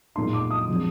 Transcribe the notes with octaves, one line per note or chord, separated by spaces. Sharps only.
A#2 G#3 D#4 C6
D6
D#6
C3 F3 G#3 D4